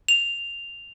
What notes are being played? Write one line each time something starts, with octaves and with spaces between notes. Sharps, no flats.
F7